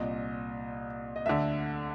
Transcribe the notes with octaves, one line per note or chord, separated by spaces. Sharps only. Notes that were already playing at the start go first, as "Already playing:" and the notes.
Already playing: C2 A#2 D#5
D#5
D2 D3 E5